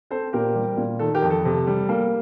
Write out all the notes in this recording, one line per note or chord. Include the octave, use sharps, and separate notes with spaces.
C4 A4 C5
A#2 G4 A#4
G3
A#2
D#3 A4
G4 A#4
F2
A4
C3
G3
A#3